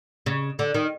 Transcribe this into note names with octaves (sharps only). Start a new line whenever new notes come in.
C#3
D3
D#3